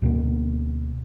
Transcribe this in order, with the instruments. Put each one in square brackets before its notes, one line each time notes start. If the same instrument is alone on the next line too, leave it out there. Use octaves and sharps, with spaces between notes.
[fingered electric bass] D2 B2 A#3 B3